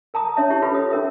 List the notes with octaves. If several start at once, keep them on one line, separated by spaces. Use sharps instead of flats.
A#4 A5 A#5 D#6
C#4 C#5 E5 A5
E4 G4 C#5
F4 G4 A4 B4 B5
D#6
C#4 A#4 E5